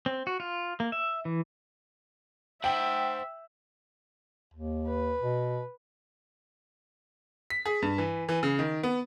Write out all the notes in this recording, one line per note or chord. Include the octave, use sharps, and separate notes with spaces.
C4
F#4
F4
A#3
E5
E3
C5 E5 F#5 G5 F#7
D#2
B4
B2
B6
G#4
G2
E3
E3
C#3
D#3
B3